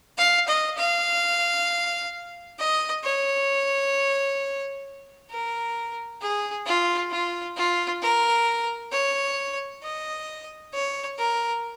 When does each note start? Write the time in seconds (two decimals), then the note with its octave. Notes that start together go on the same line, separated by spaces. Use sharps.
0.18 F5
0.48 D#5
0.78 F5
2.59 D#5
3.04 C#5
5.30 A#4
6.22 G#4
6.66 F4
7.11 F4
7.57 F4
8.02 A#4
8.92 C#5
9.83 D#5
10.74 C#5
11.18 A#4